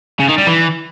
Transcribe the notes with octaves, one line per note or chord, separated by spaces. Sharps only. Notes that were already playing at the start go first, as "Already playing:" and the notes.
C#3
D#3
G3
E3